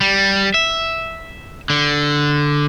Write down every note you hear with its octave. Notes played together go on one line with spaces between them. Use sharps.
G3
E5
D3